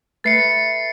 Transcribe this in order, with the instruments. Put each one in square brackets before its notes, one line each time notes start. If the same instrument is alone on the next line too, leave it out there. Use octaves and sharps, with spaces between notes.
[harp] A3 B4 E5 [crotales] A6 C7 C#7